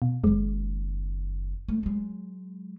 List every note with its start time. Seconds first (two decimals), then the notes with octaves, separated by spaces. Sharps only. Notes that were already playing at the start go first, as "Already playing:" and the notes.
0.02 B2
0.24 F#1 F#2 D#3 G#3
1.68 A3
1.83 F#3 G#3